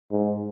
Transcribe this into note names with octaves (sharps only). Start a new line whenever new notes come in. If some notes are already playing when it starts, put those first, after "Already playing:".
G#2